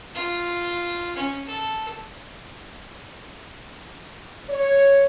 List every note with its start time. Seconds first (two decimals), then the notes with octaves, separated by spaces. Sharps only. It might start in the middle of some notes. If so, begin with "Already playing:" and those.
0.15 F4
1.16 C#4
1.46 A4
4.48 C#5